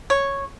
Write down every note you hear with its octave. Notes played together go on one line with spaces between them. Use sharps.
C#5